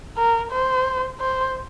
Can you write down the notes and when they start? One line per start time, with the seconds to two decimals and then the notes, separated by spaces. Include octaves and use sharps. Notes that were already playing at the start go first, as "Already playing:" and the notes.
0.17 A#4
0.51 C5
1.21 C5